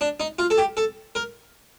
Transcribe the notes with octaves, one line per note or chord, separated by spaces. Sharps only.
D4
D#4
F4
A4
G4
A4
A#4